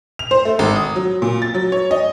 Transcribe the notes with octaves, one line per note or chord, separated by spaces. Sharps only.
F7
C5
A3
G#1
D#6
F#3
A#2
A6
F#3
C#5
D#5